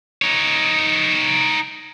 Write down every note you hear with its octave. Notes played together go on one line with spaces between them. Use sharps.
D#4 C#5